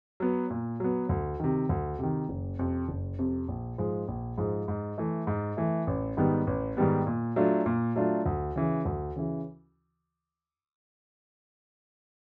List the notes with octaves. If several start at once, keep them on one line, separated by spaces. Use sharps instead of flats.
F#3 B3
A#2
F#3 B3
D2
C3 D#3
D2
C3 D#3
F#1
F2 C3
F#1
F2 C3
A#1
G#2 F3 G#3
A#1
G#2 F3 G#3
G#2
E3 A3
G#2
E3 A3
A1
G#2 D#3 G3 B3
A1
G#2 D#3 G3 B3
A#2
F#3 A3 D4 F4
A#2
F#3 A3 D4 F4
D2
C#3 E3
D2
C#3 E3